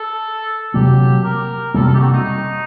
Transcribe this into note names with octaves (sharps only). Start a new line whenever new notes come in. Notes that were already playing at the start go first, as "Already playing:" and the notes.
Already playing: A4
C3 F#3 A#3 G4
A#4
C3 G3 A#3 A4
A4
G4
F#4
D#4